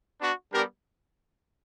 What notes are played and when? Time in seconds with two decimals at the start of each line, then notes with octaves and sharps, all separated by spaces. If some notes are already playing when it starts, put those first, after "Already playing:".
0.19 B3 D4 F#4
0.51 G3 B3 D4 G4 A#4